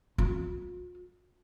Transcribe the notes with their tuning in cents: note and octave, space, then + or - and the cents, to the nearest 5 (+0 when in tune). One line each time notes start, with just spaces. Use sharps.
F4 +45